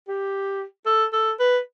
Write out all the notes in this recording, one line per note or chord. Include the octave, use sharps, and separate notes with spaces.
G4
A4
A4
B4